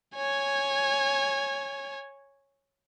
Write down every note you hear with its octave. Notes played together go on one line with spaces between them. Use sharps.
C#5 G#5